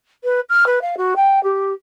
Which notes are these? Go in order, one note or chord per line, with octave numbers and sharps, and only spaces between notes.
B4
F6
B4
F5
F#4
G5
G4